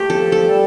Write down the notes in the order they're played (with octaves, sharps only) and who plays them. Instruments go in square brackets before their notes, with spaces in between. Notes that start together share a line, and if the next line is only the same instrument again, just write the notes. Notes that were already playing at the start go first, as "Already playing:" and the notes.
Already playing: [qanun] A3 G4
[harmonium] F3 [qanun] A4
[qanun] A4
[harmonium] G3